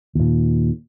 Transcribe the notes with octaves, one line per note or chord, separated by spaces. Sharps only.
D#2 A#2